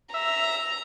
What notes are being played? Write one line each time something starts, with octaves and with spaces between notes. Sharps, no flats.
E5 A#5